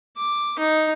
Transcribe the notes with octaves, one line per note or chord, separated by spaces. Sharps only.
D6
D#4